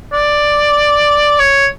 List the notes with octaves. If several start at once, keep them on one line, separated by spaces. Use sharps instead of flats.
D5
C#5